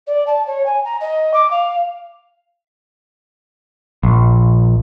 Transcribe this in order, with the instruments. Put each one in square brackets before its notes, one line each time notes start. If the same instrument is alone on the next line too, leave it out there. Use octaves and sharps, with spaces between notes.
[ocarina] D5
A5
C#5
G#5
A#5
D#5
D6
F5
[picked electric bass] A#1